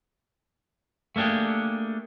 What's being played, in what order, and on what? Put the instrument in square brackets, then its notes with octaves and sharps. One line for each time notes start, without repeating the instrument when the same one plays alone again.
[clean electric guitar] A3 A#3 D4 G4 G#4